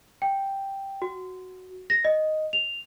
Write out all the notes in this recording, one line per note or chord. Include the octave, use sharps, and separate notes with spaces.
G5
F#4
A#6
D#5
F7